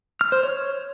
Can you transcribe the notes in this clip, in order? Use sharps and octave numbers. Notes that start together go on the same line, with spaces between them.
F6
C5
C#5